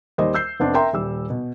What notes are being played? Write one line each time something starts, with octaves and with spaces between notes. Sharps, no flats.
D#2 G3 C5 D#5
E6 G6 C7
F1 B3 C4 D4
A#4 E5 G5 A#5 C6
D#1 G3 E6
B2